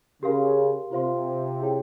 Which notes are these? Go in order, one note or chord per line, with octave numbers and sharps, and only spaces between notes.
C#3 G4 A#4 F5 C6
C3 F4 C5 F5 C6
E4 G#4 C#5 G5